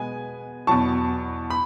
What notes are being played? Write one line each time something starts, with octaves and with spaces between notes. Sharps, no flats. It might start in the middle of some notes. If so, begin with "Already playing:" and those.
Already playing: B2 G#3 B3 G#5
E2 B2 F#3 A5 C#6
B5